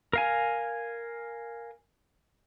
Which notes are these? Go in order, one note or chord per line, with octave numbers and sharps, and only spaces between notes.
A#4 F5 G#5